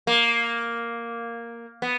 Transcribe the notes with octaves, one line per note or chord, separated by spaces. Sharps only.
A#3
B3